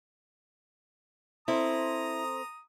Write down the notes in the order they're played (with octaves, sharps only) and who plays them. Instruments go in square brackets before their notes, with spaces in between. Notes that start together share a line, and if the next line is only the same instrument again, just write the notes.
[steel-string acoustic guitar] C4 A4 C5 [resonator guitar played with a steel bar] E4 [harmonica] A#5 D#6